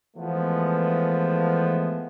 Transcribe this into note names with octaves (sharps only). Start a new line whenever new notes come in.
E3 F3 G#3 A3 B3